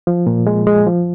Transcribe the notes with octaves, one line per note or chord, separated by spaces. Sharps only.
F3
A#2
G#3
G#3
F3